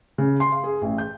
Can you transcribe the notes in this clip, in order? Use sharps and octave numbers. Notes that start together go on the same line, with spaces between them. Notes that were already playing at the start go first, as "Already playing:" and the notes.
C#3
C6
F5
G#4
A1
G6